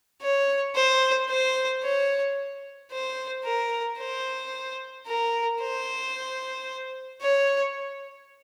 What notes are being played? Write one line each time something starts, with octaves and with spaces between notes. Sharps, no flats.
C#5
C5
C5
C#5
C5
A#4
C5
A#4
C5
C#5